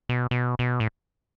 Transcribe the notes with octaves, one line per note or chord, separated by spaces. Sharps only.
B2
B2
B2
A2